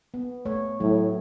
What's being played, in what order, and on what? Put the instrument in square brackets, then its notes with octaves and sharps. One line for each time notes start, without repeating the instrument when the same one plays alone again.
[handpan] B3
A3 C#5
[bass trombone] A2 [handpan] F#3